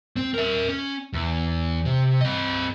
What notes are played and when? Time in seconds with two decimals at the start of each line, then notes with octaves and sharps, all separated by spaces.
0.16 C4
0.34 A#4 E5
0.69 C#4
1.13 E2
1.85 C3
2.21 C4 D#5